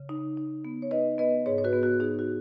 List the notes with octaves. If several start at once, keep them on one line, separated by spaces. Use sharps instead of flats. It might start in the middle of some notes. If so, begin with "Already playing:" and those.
Already playing: C#3
D#4
D#4
B3
C#5
D#4 B4 D#5
B3 B4 D#5
G#2 G#4 C#5
C#5
F#4 B4
B3
F#4
D#4 G#4
F#4